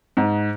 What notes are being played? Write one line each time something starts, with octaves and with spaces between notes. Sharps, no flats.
G#2